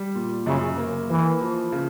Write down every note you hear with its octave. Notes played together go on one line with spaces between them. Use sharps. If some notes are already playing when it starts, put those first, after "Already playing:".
Already playing: G3
A#2
F#2 C#3
A#3
E3 A#3
F3
C#3